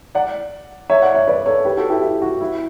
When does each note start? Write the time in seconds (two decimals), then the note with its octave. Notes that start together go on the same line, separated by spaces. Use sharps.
0.15 D5 F#5
0.90 C#5 E5
1.02 D5 F#5
1.14 C#5 E5
1.28 B4 D5
1.46 A4 C#5
1.65 G4 B4
1.77 F#4 A4
1.90 E4 G4
2.02 E4
2.22 F#4
2.41 E4